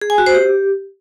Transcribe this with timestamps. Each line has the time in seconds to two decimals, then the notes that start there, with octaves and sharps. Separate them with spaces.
0.01 G#4
0.10 G#5
0.18 F#4
0.26 C5
0.35 G4